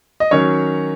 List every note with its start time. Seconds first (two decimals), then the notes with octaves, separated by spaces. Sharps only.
0.20 D#5
0.31 D#3 F#3 C#4 C#5